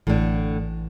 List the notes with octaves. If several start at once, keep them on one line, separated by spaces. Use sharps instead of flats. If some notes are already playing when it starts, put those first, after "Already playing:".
A1 A2 D3 E3